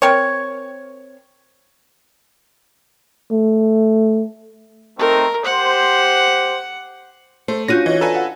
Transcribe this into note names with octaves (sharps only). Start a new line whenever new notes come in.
C4 A#4 C#5
A3
A3 C4 D#4 A#4
G4 C5 F#5
A3 C5
C#4 D4 F4 F#4 F#6 G6 A#6 D#7
E3 C#5 D#5
A4 B4 D5 F5 G#5 A#5
F5 F#5